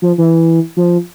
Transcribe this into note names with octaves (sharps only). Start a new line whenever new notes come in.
F3
E3
F3